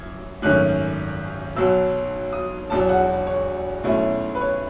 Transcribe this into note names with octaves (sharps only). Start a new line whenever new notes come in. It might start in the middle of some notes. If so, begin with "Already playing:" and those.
Already playing: F#2 E3 G#6
G#1 F#2 D#3 A3 C#4 F#6
B1 B2 F#3 E6
D#6
E1 E2 B2 F#3 A5
F#5
C#5
B1 B2 A3 C#4 E4
B4
C#5